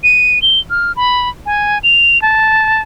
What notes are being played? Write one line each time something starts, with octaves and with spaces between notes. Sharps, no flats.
D#7
G7
F6
B5
G#5
F7
A5